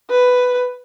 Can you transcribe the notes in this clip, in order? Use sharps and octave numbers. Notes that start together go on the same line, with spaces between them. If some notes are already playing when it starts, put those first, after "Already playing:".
B4